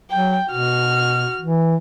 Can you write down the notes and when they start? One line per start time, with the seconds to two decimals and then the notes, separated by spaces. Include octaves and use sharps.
0.11 F#3 G5
0.49 B2 F#4 F6
1.41 E3